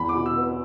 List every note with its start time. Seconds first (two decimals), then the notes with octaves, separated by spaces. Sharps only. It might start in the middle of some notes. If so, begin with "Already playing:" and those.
Already playing: E2 B5
0.09 D6
0.15 B2
0.26 E6
0.37 B3
0.43 E6